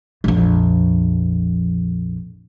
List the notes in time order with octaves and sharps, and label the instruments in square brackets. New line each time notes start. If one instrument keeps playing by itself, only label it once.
[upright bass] A#1 F2